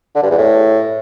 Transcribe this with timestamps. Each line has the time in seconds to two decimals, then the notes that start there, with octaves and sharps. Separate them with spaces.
0.15 D3
0.23 G2
0.30 E2
0.38 A2